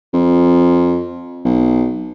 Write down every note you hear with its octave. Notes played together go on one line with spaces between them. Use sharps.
F2
B1